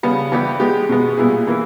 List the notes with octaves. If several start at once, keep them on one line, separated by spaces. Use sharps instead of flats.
C#3 G3 B3
E3 G3 B3 G4
G#3 B3 G4
B2 G#3 B3
A#2 G3 B3 E4 G#4
E3 A#3 E4